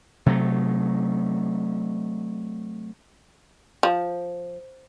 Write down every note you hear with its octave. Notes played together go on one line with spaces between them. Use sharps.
C3 F#3 A3
F3